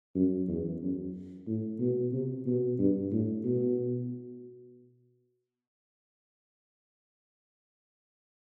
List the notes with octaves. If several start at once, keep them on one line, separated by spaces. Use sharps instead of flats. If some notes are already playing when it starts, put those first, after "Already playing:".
F#2
E2
F#2
A2
B2
C3
B2
G2
A2
B2